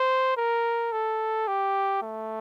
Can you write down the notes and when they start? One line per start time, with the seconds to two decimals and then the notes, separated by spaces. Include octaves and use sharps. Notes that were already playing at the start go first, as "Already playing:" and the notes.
Already playing: C5
0.37 A#4
0.92 A4
1.48 G4
2.03 A3